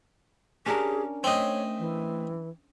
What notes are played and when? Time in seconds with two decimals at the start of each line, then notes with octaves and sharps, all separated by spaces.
0.66 C#4 D4 G4 G#4 A#4
1.24 A3 C4 C#5 D#5
1.79 E3